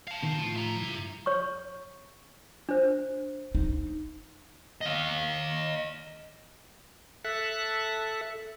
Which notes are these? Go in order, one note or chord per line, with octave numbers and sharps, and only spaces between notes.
F5 A5
B2 D#3 E3
A2 F3
E5 A#5
G2 C#3 E4
C#5 C#6
D4 C5
D#4
D#5 F5
A4 E5 F#6